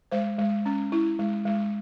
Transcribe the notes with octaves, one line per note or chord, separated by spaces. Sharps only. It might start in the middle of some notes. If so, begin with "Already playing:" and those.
G#3 C5
G#3
C#4
E4
G#3
G#3